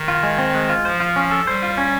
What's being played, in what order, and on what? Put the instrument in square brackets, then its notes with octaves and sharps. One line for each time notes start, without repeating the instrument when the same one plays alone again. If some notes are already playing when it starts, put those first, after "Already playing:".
Already playing: [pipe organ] D#3
[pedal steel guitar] F4
G#3
C4
G#3
F4
[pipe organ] F3 [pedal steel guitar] C5
[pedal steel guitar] F4
C#4
A4
[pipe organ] G3 [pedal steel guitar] C5
[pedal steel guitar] F4
C#4